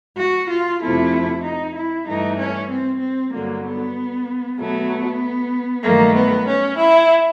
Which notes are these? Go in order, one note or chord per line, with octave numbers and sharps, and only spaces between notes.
F#4
F4
F2 C3 F3 A3 E4
D#4
E4
G2 E3 A3 D#4
C#4
C4
C4
G2 D3 F#3 A#3
B3
B2 F#3 A3 B3
G2 D#3 F#3 A3 A#3
B3
C#4
E4